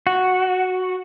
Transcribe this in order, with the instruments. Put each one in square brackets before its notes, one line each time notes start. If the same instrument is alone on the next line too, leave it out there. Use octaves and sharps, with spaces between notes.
[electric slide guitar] F#4